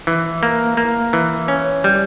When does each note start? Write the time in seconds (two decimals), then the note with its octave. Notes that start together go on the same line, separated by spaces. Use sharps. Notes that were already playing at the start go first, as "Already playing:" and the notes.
0.07 E3
0.43 A#3
0.77 A#3
1.13 E3
1.48 C#4
1.84 G3